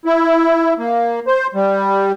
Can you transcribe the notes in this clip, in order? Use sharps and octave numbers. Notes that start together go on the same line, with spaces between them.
E4
A#3
C5
G3